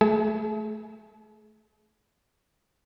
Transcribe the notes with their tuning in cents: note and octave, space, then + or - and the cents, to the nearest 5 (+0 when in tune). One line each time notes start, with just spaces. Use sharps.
A3 -15 G#4 +35 A5 -40